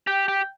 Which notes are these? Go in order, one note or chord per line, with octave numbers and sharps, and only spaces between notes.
G4 G5
G4